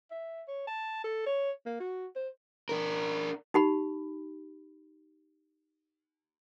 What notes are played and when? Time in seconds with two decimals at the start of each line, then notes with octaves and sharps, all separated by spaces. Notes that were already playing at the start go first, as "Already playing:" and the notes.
0.11 E5
0.48 C#5
0.67 A5
1.04 A4
1.26 C#5
1.66 A#3
1.80 F#4
2.16 C5
2.69 D4 A#4
3.54 D#4 G4 B5